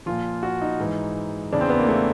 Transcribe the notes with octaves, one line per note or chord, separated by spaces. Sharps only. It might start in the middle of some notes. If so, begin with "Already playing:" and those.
A#2 F3 F4
F#4
D#4
G#2 E3
E2 C#3 E3 D4
C4
B3
A#3
A3